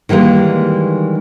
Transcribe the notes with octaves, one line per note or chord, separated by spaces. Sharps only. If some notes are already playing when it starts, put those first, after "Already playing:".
D#3 E3 G3 G#3 A#3